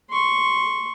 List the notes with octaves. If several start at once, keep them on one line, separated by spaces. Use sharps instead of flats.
C6 C#6